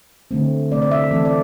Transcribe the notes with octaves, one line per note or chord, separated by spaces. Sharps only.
D3 A3 C4
C3 A3 C4 D5
D5
E5
E3 A3 C4 A4
D5